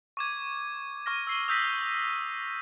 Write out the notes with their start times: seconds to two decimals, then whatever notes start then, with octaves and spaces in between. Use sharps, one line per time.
0.17 C#6 D6 G#6
1.06 C#6 F6 A#6
1.27 E6 C7 G7
1.48 D#6 E6 G6 A#6 B6 D#7